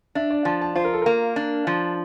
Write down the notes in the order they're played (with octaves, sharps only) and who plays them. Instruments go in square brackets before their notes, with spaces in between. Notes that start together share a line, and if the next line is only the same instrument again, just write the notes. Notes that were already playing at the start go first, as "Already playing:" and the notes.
[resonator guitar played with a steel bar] D4 [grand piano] E5
[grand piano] D5
[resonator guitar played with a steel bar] F3 [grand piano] A5
[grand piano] A5
[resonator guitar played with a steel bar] F4 [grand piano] C5
[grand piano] A#4
A4
[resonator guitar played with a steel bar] A#3 [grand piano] A#4
[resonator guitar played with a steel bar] D4
F3